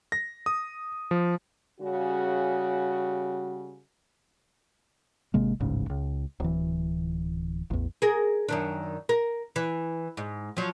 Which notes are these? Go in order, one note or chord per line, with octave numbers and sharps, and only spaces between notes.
A#6
D#6
F3
C#3 G3 F#4
G#1 C3 G#3 A#3
D1 A1 G#2 C#3
C#2
D1 E3
A1 E2
G#4 A#4
F#2 D#3 D4
A#4
E3
G#2
F3 F#3